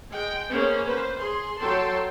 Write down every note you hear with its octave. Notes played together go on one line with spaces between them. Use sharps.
G#3 G5
A#3 B3 C#4 G#4 C5
B4 C5
G#4 C6
F#3 A4 G5 A5 C6